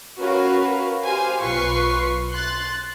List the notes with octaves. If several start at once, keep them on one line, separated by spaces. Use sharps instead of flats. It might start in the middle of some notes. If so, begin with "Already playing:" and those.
C#4 F#4 A#4 B4 F5
G4 C5 F5 G#5
B1 F4 B4 C#6 C7
C6 F#6 A6